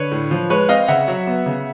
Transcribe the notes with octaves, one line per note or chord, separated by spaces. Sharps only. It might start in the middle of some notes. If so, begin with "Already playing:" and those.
Already playing: D3 B4 C#5
A2
F3
G#3 B4 C#5
C4 D#5 F5
C#3 E5 F#5
F#3
B3
C#3